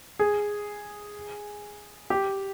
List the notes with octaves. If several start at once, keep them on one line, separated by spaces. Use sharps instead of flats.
G#4
G4